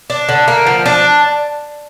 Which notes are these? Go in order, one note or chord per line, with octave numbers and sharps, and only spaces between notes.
D4
D3
A#3
F3
D4